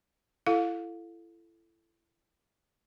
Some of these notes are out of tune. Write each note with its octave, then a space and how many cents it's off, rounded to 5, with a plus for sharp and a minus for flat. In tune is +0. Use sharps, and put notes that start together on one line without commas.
E4 +30 A4 +0 F5 +25